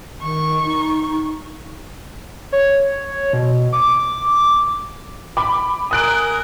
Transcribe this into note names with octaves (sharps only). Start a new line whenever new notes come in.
D#3 C#6
D#4
C#5
B2
D6
B5 D6
A#4 G#5 D#6 F#6 D7